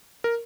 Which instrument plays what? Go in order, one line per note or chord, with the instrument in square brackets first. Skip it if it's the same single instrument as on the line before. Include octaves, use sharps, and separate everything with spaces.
[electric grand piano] A#4